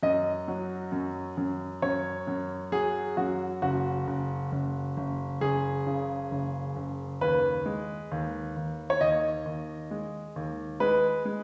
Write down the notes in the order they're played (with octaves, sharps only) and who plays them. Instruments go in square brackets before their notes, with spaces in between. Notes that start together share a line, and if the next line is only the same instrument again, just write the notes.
[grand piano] F#2 D#5
F#3
F#2
F#2
F#2 C#5
F#2
F#3 G#4
F#2 F#4
F#1 F#4
F#1
F#1
F#1
F#1 G#4
C#3
F#1
F#1
D#2 B4
G#3
D#2
D#2
C#5
D#2 D#5
D#2
G#3
D#2
G#3 B4
G#3